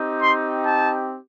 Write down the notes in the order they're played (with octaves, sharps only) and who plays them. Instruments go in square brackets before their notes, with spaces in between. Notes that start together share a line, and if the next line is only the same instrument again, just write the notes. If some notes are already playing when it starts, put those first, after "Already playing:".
Already playing: [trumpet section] C4 D#4 G4
C6
A5